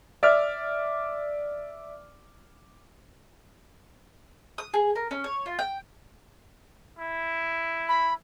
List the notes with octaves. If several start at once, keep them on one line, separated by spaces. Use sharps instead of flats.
D5 E5 D6 F6
D#6
G#4
A#4
C#4
C#5
F4
G5
E4
B5